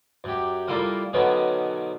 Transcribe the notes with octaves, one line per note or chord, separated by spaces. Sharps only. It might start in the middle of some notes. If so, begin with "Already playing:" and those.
F#2 G4
G3 A#3 E4 F4 A4 A#4
B2 D3 D#3 F#3 B3 C#4